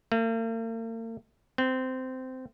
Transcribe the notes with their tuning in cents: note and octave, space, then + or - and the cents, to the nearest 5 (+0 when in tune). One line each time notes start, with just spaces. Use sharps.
A#3 -45
C4 -20